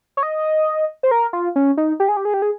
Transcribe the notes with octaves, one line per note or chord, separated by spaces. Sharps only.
C#5
D#5
C5
A#4
F4
C#4
D#4
G4
G#4
G4
G#4
G4
G#4